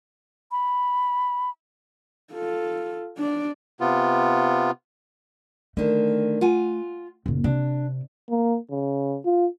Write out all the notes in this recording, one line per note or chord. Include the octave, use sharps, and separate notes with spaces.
B5
F4 A4
D4 D5
C3 B3 F4
D3 D#3 A3
F4 F#5 G#5
F#1 A#2
C3 D4
A#3
C#3
F4